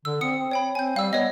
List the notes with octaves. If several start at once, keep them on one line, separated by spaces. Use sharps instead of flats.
D3 E6
C4 D#6 C#7
C#5 G5 B5
C4 G#5 G6
G3 F5 E6
B3 C#5 D#5